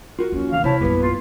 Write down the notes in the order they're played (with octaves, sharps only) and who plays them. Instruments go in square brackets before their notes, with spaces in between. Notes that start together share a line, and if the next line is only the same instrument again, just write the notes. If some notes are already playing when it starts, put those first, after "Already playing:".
[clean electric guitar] F4 F#4 [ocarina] A#4
[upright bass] D#2 F3 [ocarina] C#4
[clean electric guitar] C2 C3 E3 [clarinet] F5
[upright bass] C3 [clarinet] E4 [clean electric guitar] C5 A5 [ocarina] C#5
[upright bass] A#1 F#2 [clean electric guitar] G3 B3 G4 [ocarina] B4
[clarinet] F4